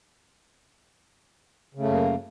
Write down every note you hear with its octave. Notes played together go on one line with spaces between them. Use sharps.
F#2 C#3 A3 A#3